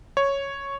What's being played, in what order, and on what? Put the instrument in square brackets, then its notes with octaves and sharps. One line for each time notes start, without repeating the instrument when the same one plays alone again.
[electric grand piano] C#5